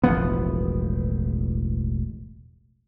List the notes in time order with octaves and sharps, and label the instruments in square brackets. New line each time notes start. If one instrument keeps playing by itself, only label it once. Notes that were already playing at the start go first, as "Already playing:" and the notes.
[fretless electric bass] E1 A1 F3 B3